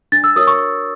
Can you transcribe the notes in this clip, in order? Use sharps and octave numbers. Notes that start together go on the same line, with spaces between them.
D4 A6
E6
F#4 A#4 C#5 D#6
C#6